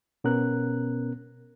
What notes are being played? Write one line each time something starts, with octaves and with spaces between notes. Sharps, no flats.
B2 B3 C#4 A#4 F#6